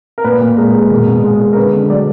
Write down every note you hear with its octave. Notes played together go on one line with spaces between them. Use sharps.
A#4
A#2 B4
A#2
G#3 A#4
G#3
B2 A#4
B2
G#3
G#3
A#4
D3 B4
D3
F#3 D5